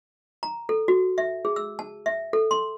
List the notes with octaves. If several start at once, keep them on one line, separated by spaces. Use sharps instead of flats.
A#5
A4
F#4
E5
G#4
E6
A5
E5
A4
C6